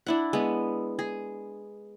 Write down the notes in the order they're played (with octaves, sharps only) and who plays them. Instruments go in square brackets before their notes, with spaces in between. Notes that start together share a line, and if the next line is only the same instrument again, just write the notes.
[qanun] D4 E4 F#5
G#3 B3
G#4